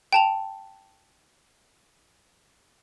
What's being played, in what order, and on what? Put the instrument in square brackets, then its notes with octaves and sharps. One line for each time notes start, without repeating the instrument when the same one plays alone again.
[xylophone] G5 A5 F7